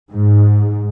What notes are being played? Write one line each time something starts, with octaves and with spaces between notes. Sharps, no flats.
G#2